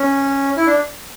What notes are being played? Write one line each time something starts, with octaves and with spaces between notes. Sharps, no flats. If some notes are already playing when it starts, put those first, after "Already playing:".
Already playing: C#4
E4
D4